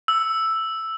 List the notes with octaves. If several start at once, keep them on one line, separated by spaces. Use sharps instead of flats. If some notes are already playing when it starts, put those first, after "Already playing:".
E6